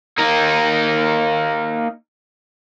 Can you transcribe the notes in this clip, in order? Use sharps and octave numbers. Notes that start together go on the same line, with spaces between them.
A#3 D#4